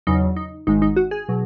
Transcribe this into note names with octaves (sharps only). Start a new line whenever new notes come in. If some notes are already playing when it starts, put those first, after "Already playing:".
E2 C#3 F#3 D#4
D#4
G#1 G#2 D#3 G#3 D#4
D#4
F#4
G#4
B2 F#3